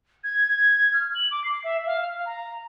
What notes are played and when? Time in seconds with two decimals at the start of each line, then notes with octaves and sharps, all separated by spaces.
0.24 G#6
0.93 F6
1.15 F#7
1.31 D6
1.44 C7
1.64 E5
1.86 F5
2.00 F5
2.26 A#5